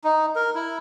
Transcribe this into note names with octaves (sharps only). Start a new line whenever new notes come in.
D#4
A#4
E4